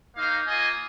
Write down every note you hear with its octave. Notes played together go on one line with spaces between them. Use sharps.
A#3 D#4 C5 F5
A#3 F4 D#5 G#5